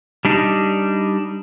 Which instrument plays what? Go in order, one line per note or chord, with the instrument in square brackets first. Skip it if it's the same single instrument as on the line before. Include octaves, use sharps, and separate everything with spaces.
[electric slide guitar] G3 D4 D#4